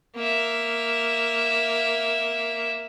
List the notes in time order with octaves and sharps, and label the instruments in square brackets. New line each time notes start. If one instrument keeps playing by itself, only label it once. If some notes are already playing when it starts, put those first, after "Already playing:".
[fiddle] A#3 E5